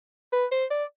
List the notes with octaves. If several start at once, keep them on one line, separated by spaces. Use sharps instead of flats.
B4
C5
D5